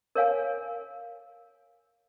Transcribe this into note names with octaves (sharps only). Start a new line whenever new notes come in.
A#4 C#5 F5 G#5